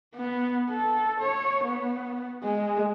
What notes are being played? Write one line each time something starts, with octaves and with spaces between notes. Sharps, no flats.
B3
A4
C#5
B3
G#3